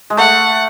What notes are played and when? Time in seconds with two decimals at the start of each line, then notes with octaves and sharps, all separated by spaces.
0.10 G#3
0.17 A3 F#5